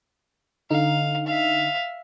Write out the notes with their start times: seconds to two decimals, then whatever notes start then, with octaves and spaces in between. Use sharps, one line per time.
0.71 D3 D#4 F5
1.27 E5 F5